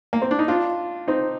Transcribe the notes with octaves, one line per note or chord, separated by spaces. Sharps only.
A#3
C4
D4
D#4
D4 F4
C4 D#4